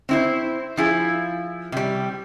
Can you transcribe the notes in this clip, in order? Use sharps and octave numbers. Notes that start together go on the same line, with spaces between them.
C4 E4 C5
F3 E4 G#4
C3 G3